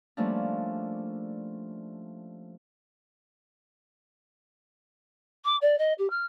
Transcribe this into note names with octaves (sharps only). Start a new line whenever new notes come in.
F3 G3 A3 A#3 C#4 D4
D6
D5
D#5
G4
F6